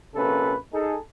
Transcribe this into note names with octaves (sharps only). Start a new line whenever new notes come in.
A#1 C3 A#3 C#4 A4 B4
D#4 G#4 A4